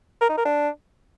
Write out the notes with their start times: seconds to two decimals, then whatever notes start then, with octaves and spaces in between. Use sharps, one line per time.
0.21 A#4
0.29 D#4
0.37 A#4
0.45 D4